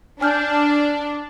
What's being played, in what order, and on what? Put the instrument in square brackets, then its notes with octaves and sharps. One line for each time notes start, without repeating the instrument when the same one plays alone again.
[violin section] D4 [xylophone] G#5 F6 G6